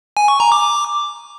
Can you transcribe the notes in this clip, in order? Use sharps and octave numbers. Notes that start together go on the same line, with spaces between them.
G#5
C#6
A#5
D6